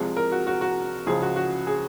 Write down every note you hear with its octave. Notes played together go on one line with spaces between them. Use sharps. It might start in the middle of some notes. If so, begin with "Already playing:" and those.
Already playing: C2 C3 F3 G#3
A#4
F#4
F#4
F#4
C#2 C#3 F3 G#4
F#4
F#4
G#4